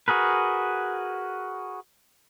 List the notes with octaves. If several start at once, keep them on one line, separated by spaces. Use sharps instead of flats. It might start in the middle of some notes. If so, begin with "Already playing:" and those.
F#4 G#4 A#4 B4